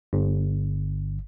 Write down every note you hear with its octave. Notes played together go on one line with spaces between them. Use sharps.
G1